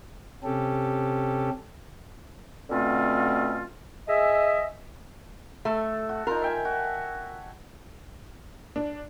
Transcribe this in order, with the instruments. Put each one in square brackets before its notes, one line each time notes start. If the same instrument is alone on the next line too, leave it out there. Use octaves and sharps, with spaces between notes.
[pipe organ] C3 C#4 G4 A4
[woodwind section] B2 D3 A3 C4 C#4 F4
G#4 D#5 E5
[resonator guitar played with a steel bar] A3 [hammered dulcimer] A4
[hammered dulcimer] F#4
[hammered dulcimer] D#4 F4 [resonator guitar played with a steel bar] A#4
[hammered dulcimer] E5 G5 G#5
F#4
[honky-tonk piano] D4